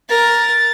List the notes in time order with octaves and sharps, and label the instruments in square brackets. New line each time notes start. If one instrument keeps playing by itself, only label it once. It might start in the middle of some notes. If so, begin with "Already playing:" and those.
[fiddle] A#4 [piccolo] A6